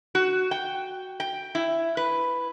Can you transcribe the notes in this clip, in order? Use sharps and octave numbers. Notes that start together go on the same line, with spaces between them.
F#4
G5
G5
E4
B4